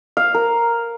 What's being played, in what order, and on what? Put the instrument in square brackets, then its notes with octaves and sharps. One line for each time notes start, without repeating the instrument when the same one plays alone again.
[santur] F5
A#4